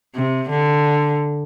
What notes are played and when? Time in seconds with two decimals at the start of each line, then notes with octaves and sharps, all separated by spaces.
0.16 C3
0.50 D3